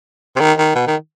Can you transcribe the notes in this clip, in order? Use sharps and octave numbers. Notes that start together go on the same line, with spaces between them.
C3
D#3
D#3
B2
D#3